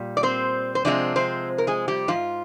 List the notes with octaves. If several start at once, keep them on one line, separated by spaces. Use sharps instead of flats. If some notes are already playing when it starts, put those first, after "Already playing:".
Already playing: A#2 G3
D5
C4 C5
C5
C3 F3 G#3 C4 D4 D5
C4 C5
A#4
G#3 G#4
G3 G4
G#2 F3 F4